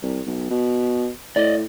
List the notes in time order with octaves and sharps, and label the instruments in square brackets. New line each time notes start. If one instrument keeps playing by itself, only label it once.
[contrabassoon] C2
B1
B2
[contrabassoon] A2 [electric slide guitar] D5 D#5